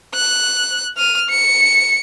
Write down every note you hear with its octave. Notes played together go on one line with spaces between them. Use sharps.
F#6
F6 D#7
C#7